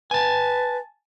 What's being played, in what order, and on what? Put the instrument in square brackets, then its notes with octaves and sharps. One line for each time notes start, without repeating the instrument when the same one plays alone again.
[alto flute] B4 [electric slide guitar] G#5 A5